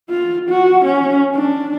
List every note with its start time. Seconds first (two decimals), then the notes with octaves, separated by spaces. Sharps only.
0.10 F4
0.49 F#4
0.85 C#4
1.35 D4